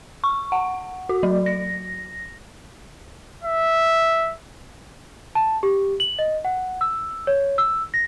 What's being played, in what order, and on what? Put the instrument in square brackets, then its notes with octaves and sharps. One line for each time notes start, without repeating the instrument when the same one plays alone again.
[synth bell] C#6
F#5
F#4
F#3
A#6
[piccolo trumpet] E5
[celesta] A5
G4
F#7
D#5
F#5
E6
C#5
E6
A#6